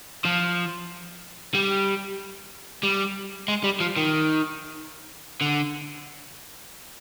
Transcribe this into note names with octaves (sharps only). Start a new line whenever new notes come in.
F3
G3
G3
G#3
G3
F3
D#3
D3